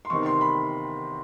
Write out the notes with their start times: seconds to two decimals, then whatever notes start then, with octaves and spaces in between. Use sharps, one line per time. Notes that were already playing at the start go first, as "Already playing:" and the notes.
0.05 C6
0.10 E2 C3 D#3 C#6
0.26 C6
0.41 B5